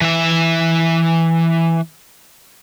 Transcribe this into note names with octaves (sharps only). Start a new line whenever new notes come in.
E3 E5